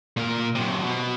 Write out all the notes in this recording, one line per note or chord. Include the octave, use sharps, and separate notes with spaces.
A#2 A#4
F#2 C3
B2